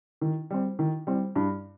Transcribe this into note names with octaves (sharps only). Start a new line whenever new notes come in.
D#3
G3 C4
D#3
G3 C4
G2